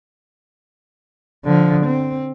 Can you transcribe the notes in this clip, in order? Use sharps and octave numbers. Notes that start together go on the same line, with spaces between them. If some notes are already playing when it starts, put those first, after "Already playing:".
D3 F3
C4